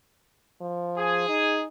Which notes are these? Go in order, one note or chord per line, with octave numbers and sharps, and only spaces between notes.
F3
G#4
D#4